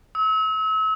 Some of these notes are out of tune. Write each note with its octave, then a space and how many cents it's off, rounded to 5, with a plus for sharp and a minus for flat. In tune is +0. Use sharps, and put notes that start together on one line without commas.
E6 -40